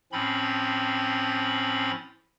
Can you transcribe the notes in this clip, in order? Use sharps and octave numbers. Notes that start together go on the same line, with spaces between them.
A2 F3 C4 C#4 B5 C6